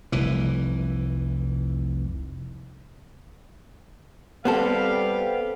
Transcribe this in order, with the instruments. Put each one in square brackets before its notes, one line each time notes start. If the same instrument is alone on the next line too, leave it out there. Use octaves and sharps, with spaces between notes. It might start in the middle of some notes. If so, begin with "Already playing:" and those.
[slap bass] F1 C2 E3
[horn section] G3 G4 F5 [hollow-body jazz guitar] B3 C4 A4